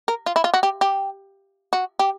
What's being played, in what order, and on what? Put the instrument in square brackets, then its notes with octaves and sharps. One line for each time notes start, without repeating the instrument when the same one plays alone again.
[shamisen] A#4
F4
E4
F4
F#4
G4
G4
F#4
G4